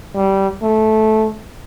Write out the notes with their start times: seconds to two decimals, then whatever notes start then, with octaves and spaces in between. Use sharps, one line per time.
0.15 G3
0.62 A3